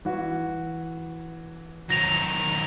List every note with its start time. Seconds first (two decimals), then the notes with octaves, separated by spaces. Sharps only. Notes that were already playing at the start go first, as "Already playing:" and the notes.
0.05 E3 F#4
1.90 D#3 F#3 A#6 F7